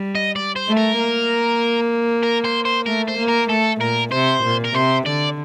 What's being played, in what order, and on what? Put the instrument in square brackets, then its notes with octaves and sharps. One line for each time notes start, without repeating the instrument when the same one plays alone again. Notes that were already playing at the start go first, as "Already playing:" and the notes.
Already playing: [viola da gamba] G3
[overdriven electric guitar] D#5
D5
C5
[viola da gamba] A3
[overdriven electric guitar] A#4
[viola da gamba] A#3
[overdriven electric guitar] A#4
C5
C5
[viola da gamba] A3 [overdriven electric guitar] A#4
[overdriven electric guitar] C5
[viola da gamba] A#3
[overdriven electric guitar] A#4
[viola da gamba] A3 [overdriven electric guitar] A4
[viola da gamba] A#2 [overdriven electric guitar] A#4
[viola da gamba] C3 [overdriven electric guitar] C5
[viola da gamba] A#2
[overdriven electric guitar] A#4
[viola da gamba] C3 [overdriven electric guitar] C5
[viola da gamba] D3 [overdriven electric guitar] D5